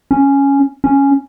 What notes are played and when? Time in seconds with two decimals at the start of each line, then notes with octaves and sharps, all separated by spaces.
0.11 C#4
0.84 C#4